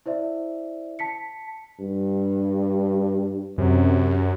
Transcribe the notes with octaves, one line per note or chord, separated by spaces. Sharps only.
E4 C5 D5 E5
A5 B6 C#7
G2
F#2 C3